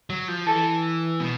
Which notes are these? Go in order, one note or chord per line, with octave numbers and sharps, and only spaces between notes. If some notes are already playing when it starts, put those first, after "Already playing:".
F#3
F3
E3 A4
B2